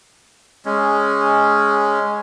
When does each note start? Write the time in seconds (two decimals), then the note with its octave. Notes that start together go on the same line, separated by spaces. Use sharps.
0.65 G#3 C#4